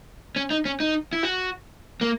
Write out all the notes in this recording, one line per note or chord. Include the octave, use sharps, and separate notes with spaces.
C#4
D#4
C#4
D#4
E4
F#4
A#3